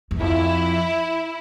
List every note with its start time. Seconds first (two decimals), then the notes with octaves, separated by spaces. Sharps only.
0.11 E2
0.20 F2 E4